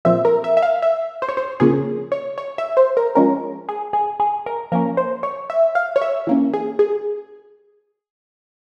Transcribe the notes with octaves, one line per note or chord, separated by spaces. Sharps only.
A#2 F3 C4 E5
A#4
E5
E5
F5
E5
C5
C#5
C5
C#3 F3 A#3 C#4 G#4
C#5
C#5
E5
C5
A#4
F3 G#3 C#4 A#4
G#4
G#4
G#4
A#4
F3 A#3 C#4 A#4
C5
C#5
E5
F5
C#5
E5
E3 A#3 C#4
G#4
G#4